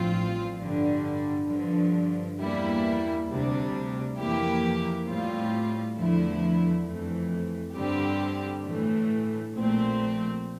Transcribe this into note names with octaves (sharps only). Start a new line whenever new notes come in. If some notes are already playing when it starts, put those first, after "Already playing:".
Already playing: A1 G2 F3 C4 F4
G1 G2 D3 G3
G2 D3 F3
E2 E3 G3 A#3 E4
D2 C3 G3 D4
F2 E3 A#3 E4 G4
A2 G3 C4 F4
E2 D3 F3 A3 E4
F2 E3 A3
G2 D3 G3 C4 G4
A2 E3 A3
A#1 A#2 F3 A3 C4